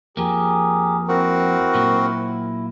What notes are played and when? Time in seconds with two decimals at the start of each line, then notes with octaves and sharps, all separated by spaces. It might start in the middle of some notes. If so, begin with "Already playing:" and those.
0.17 F2 F3 A#3 G4 G#4 A#4
1.08 C4 E4 F#4 A#4
1.75 A#2 F#3 A#3